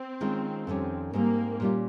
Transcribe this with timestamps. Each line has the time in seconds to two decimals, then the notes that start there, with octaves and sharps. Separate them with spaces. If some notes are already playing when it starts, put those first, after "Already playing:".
Already playing: C4
0.21 D#3 G#3 C#4 F4
0.67 F2 D#3 G3 C#4
1.13 G#2 G3 A#3 C4
1.60 A#2 G3 C#4 F4